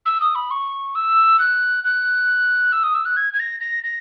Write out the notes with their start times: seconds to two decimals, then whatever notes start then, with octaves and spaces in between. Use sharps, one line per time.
0.05 E6
0.20 D#6
0.35 B5
0.50 C#6
0.95 E6
1.39 F#6
1.84 F#6
2.72 E6
2.83 D#6
2.94 E6
3.05 F#6
3.16 G#6
3.33 G#6
3.39 A#6
3.60 A#6
3.84 A#6